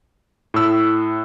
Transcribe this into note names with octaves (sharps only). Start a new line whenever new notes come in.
A2 E6